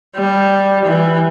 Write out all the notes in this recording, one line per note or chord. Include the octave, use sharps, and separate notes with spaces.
G3
E3